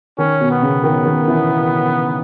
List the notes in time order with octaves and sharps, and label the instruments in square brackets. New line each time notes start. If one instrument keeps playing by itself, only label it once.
[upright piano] D#3 [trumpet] C#4
[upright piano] B2
[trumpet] B3
[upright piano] C#3
D#3
D#3
E3